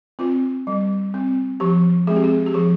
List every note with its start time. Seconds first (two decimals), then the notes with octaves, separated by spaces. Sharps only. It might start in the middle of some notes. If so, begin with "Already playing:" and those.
0.19 C4 F4
0.67 G3
1.14 C4
1.60 F3 G4
2.07 G#3 C4 G#4
2.16 G4
2.24 G#4
2.46 G4
2.54 F3 G#4